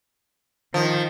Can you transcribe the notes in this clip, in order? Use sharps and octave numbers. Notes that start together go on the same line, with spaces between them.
D#3 F3